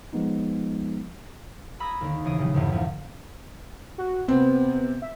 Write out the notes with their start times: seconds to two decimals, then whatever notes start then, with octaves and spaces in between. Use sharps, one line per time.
0.13 F3 G#3 B3 D#4
1.80 A#5 B5 D#6 E6 G#6 A#6
2.01 D#2 D3 D4
2.25 C2 C#3 E3 G#4 D#6 D7
2.38 A#2 C#3 F3 G3
2.53 G1 E2 G2 D3 F3
2.72 E2 A#2 F3
3.98 F#4
4.28 C3 B3 C4
5.02 E5